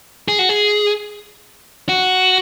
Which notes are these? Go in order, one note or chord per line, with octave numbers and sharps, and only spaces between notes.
G#4
F#4
G#4
F#4